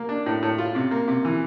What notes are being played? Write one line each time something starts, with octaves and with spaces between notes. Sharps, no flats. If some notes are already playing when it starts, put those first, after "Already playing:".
Already playing: A#3
D4
A2
A2
F4
C3
A#3
C3
E3